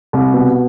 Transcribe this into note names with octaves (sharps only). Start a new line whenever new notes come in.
C2
B2